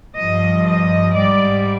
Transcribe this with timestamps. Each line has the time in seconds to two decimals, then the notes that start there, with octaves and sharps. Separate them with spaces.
0.15 G2 F3 D#5
0.66 D#5
1.15 G#2 G3 D5